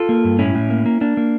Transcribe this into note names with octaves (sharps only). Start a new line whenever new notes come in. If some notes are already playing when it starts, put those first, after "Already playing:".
Already playing: F4 A4
A#3
G2
A2 C#4 E4
A2
A#3
A#3
A#3 D4
A#3